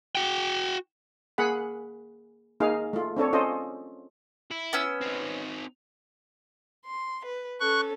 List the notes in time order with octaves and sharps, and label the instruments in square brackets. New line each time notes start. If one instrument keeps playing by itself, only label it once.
[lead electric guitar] F#4 G5
[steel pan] A#3 G#4 F#5 B5
A#3 D#4 G#4 F5
A3 F4
C4 D4 A4 C#5
C#4 F4 A4 C5 D#5
[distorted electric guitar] E4
[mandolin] B3 C#4 E6
[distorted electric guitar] C4 D#4
[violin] C6
B4
[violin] C#4 A4 [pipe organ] C#6 F#6